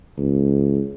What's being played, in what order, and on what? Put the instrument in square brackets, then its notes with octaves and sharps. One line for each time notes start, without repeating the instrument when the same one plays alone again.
[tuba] C#2